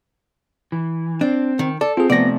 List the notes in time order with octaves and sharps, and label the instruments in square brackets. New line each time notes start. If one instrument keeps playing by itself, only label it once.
[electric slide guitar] E3
[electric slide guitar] C4 [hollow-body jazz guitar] D4
[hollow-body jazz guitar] D#3
[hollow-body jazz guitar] A4 [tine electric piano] D5
[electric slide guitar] C4 [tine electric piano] F4 G#4
[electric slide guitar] C3 A3 [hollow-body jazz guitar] F3 D5 [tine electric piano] B3 A#6